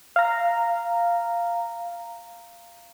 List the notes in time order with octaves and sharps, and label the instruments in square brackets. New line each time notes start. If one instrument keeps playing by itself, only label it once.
[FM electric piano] F5 A#5